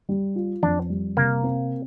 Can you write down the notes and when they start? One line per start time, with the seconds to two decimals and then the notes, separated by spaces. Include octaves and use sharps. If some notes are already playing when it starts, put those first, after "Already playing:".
0.09 G3
0.36 F4
0.63 F2 D4
0.89 G3
1.17 C3 A#3
1.43 C4